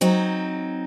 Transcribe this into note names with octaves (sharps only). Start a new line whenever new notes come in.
F#3 C4 D#4